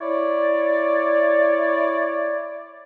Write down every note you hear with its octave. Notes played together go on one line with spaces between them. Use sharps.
E4 C#5 D5